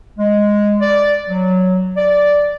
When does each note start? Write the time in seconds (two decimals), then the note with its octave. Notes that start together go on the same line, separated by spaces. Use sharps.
0.19 G#3
0.81 D5
1.28 F#3
1.97 D5